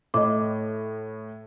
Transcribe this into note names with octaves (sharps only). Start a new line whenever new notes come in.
A2 D#5 D6